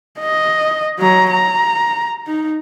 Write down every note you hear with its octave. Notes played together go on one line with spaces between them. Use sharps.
D#5
F#3 A#5
A#5
D#4